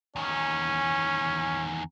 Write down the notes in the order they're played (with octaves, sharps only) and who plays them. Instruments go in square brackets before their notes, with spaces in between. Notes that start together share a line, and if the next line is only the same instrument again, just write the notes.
[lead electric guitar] E2 D#3 [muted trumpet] C#4